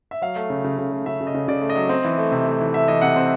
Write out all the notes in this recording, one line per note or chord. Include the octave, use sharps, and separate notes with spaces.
E5
F#3 F5
A3
C#3
C#3
C#3
A3
C#3 E5
C#3
D#5
C#3
C#3 D5
A3
D#5
F#3
C4
E3
A3
C3
A3
E3
A3 E5
E3 D#5
C3 F#5
C4